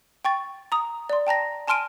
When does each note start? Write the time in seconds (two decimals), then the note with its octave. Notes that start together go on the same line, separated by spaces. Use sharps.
0.25 G5 C#6 A6
0.72 A#5 D#6
1.10 D5 C6
1.27 G5 A5 A#5 A#6
1.68 G#5 A5 C6 F6 D7 D#7